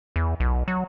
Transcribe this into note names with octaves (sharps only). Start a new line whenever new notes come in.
E2
B1
F#3